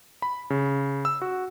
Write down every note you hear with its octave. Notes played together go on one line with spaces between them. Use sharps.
B5
C#3
E6
F#4